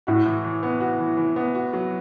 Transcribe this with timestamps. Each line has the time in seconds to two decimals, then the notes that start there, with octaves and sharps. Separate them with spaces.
0.07 A2 F#4
0.26 E3
0.44 E3
0.63 B3
0.80 F#4
0.99 E3
1.17 E3
1.36 B3
1.55 F#4
1.73 F#3